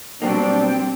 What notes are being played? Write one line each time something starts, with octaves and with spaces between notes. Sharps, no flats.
B2 F#3 G3 A#3 C4 D4 G5